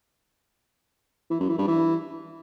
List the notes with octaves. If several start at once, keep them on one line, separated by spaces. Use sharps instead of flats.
E3
F#2
E3
G2
E3